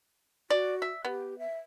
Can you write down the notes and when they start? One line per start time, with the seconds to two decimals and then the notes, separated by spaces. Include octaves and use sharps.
0.50 F#4 D5
0.82 E5
1.05 B3 G4
1.39 E5